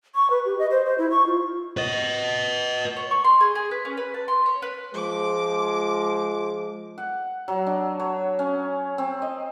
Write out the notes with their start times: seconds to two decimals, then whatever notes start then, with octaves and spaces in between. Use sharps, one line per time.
0.15 C#6
0.30 B4
0.45 G4
0.59 D#5
0.71 C5
0.86 C5
0.98 E4
1.10 C#6
1.27 F4
1.77 B4 D#5
2.97 C#5
3.11 C#6
3.24 C6
3.41 G#4
3.55 G#4
3.71 B4
3.85 C#4
3.97 B4
4.14 A5
4.28 C6
4.46 C#5
4.62 B4
4.94 F3 G#3 D6
6.98 F#5
7.48 F#3
7.67 D4
8.00 C#5
8.39 C#4
8.98 C4
9.22 D#5